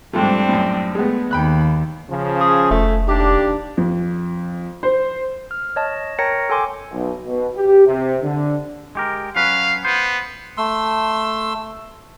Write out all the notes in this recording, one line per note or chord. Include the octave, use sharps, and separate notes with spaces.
G#2 F3 G3 A3 C4 D4
F#2 A2
G#3 A3 B3
D#2 G5 B5 F#6
C#3 F3
G#4
F1 A3
D#2 D4 G4
F2
C5
F6
C#5 D#5 A5
A#4 C#5 G5 A#5 A#6 C#7
A4 G5 G#5 C6 D6
B1
B2
G4
C3
D3
G#3 G4 A#4
F#3 C#4 B4 F5
B3 C5
A3 C6 E6